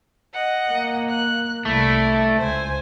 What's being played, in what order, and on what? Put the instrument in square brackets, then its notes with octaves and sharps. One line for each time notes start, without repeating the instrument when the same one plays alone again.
[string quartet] D#5 F#5
[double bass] A#3
[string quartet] F#6
[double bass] C2 [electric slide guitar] A3 [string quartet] E4 D5
[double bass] C#2 [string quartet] C5 G#5